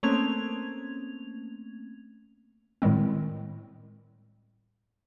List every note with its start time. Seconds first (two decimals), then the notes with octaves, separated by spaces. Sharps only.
0.03 A3 A#3 C4 C#4 G#6 F7
2.82 A2 D#3 G3 G#3 C4